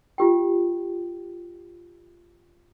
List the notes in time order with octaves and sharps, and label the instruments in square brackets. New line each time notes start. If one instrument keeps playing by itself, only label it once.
[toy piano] F4 G4 G5